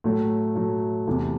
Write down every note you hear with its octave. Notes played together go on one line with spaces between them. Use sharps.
A2 F#3 A3
A2 F#3 A3
E2 C3 E3 A3